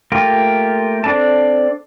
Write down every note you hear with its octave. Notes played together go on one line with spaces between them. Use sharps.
A3 A#3 F4 G4
C4 D4 A4 A5